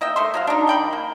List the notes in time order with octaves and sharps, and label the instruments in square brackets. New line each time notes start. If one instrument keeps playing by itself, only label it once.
[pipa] A#3 D#5 E5 G5
A3 E5 C6
F#3 D#5 F5
D4 D#4
D#3 G5 B5
A#3